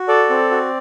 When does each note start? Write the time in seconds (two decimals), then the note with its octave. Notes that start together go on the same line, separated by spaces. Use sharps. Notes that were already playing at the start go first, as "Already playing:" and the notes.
Already playing: F#4
0.08 A4 D5
0.30 C4
0.51 F#4